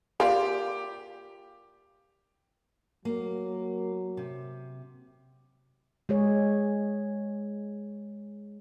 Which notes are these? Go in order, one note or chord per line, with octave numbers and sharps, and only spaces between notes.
A#3 F4 G4 D5
F#3 A#3
C3
G#3 G#4 C#5